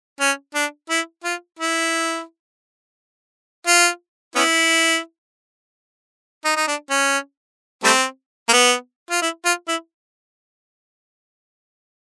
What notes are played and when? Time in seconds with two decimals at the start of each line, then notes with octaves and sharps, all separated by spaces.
0.20 C#4
0.55 D4
0.89 E4
1.24 F4
1.59 E4
3.67 F4
4.35 B3 C#4 E4
6.45 D#4
6.56 D#4
6.68 D4
6.90 C#4
7.84 G3 A3 C4
8.49 A#3
8.52 B3
9.10 F4
9.22 E4
9.45 F4
9.68 E4